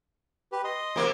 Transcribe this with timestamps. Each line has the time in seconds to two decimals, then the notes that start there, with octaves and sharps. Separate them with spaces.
0.52 G4 B4
0.64 D#5 C6 D#6
0.96 C3 A#3